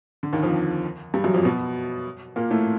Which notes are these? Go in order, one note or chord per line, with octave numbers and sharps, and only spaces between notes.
D3
D#2 D#3
F2 F3
G2 G3
F#2 F#3
F2 F3
B2 B3
A#2 A#3
A2 A3